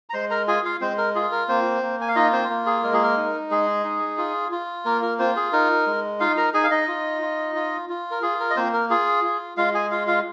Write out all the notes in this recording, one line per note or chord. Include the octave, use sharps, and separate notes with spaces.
A#5
G#3 C5 C6
A#4 A#5
F4 G#4 G#5
F4 F5
G#3 C4 C5
A#4
F4 G#4
A#4
A#3 C4 C5
A#3
G#5
F5
D#4 F4 D#5
C4 C5
A#3
G#4
G#3 A#4
G#4
A#4
D#4
G#3 G#4
D#4
F4
F4
A#3 A#4
A#4
C4 F4 C5
G#4
D#4 A#4
G#3
D#4 F4 F5
A#4 A#5
D#4 G#4 G#5
F5
D#4 D#5
F4
F4
F4
F4
A#4
F4 G#4
A#4
D#5
A#3 C4 C5
A#4
F4 G#4
F4
G#3 F4 F5
G#4 G#5
F4 F5
F4 F5